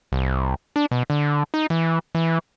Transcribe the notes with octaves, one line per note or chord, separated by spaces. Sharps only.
C2
D4
B2
D3
D#4
E3
E3